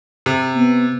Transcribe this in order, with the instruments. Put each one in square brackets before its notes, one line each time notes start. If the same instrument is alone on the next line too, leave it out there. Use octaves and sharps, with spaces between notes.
[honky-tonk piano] C3
[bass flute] B3